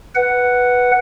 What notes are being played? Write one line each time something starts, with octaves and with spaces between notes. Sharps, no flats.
B4 F#5